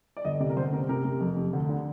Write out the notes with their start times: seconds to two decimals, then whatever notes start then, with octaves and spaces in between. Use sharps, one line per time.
0.17 D5
0.25 G1 D#5
0.40 C3 D5
0.50 A#4
0.56 G1 C5
0.73 C3 A#4
0.89 C3 A#4
1.05 C3
1.21 F2
1.37 C3
1.53 D2
1.69 D3